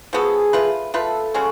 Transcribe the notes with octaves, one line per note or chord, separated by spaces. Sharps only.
F3 B3 F#4 G#4 A4
A3 F4 B4
A3 F4 A4 B4
C#3 G#3 C#4 F#4